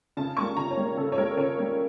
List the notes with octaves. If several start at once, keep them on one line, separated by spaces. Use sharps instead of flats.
C#3 A5
G3 A#3 C#6
C#3 A#5
C#5
G3 A#3
C#3 A4
C#5
G3 A#3 A#4
C#3 C#5
G3 A#3